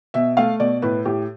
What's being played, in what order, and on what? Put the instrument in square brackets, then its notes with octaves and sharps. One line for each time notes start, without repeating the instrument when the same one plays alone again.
[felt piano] B2 E5
A3 F5
B2 D5
A2 B4
A2 G4